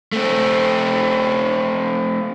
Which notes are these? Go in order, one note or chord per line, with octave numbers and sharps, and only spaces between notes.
A3 C4